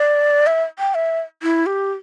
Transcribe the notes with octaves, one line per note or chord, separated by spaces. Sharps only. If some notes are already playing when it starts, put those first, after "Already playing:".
Already playing: D5
E5
G5
E5
E4
G4